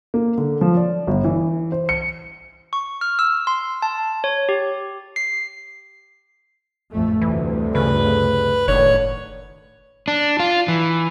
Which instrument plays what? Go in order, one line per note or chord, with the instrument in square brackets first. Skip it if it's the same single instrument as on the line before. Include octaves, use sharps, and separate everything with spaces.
[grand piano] A#3
D3
F3
D5
G1
E3
C5
C#7
[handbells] C#6
F6
E6
C6
A5
C#5
G4
C7
[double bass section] A1 F2 A3
[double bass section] D2 G2 C3 [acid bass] E3
[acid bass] C#3 [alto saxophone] B4
[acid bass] F#1 [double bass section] A2 D3 D#3 [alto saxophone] C#5
[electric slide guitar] D4
F4
E3